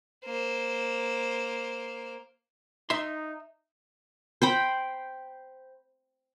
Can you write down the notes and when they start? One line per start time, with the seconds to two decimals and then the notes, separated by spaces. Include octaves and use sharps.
0.25 A#3 C5
2.90 D#4 E5 C6
4.42 C5 G5 B5